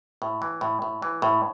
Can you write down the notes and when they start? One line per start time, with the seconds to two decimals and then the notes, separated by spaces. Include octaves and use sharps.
0.22 A2
0.42 E3
0.61 A2
0.82 A2
1.02 E3
1.22 A2